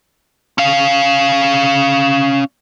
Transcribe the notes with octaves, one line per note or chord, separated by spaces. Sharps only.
C#4 F5